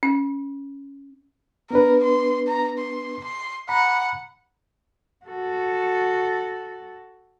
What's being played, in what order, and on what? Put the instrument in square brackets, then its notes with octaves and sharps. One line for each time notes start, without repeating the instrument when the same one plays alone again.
[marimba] C#4
[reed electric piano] B3 D4 B4 [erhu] A#4
[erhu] C6
A#5
C6
C6
[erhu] F#5 [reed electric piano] A#5 B5
[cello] F#4 A4